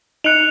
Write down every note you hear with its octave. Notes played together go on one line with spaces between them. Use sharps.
D#4 F#6 C#7 F7